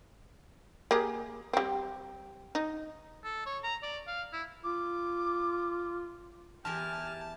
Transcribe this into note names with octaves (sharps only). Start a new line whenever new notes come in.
A#3 G4 G#4
G3 C4
D#4
A4
C#5
A#5
D5
F5
E4
F4 D6
E2 E3 G4 A#4 G#5 A5 F6